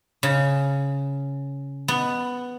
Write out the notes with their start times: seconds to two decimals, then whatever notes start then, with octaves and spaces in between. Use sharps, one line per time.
0.23 C#3
1.88 B3